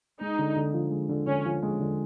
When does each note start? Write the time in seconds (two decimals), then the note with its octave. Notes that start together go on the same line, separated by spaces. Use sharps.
0.21 G#3 D#4
0.39 D3
0.56 D3
0.74 F3
0.91 G#3
1.09 D3
1.27 D3 C#4
1.45 F3
1.63 G#3
1.80 D3